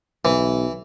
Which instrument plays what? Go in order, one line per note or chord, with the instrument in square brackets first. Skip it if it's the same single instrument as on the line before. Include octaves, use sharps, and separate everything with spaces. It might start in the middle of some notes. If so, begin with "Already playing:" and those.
[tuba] B1 [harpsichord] E3